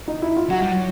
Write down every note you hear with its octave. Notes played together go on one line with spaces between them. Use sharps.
D#4
E4
F4
F#3 F#4
G3
F#3